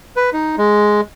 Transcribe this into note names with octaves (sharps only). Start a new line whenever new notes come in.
B4
D#4
G#3